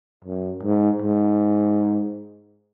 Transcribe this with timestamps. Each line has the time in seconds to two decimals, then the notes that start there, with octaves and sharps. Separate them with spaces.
0.25 F#2
0.63 G#2
1.02 G#2